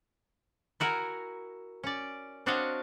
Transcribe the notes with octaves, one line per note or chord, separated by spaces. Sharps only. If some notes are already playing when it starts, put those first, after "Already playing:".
E4 F#4 A#4 G#5 A#5
C#4 D5
C4 D4 F#4 C#5 D#5 F5